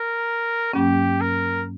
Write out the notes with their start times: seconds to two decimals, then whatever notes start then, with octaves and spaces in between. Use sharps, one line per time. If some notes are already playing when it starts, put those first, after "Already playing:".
Already playing: A#4
0.73 G2 F#3 A#3 C#4 G4
1.21 A#4